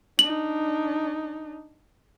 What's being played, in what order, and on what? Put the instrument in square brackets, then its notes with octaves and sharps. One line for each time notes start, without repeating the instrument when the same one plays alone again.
[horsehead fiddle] D4 D#4 [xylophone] F#7